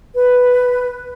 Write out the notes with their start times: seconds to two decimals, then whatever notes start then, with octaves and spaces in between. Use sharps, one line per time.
0.15 B4